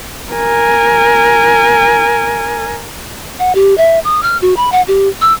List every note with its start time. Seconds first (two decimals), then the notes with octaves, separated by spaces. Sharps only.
0.32 A#4 G#5
3.39 F#5
3.55 G4
3.78 E5
4.04 D#6
4.23 F6
4.42 F#4
4.56 B5
4.72 F#5
4.88 G4
5.21 E6